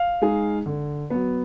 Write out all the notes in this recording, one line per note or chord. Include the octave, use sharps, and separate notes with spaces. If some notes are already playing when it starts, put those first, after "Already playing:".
Already playing: F5
G#3 D#4 G#4
D3
F#3 B3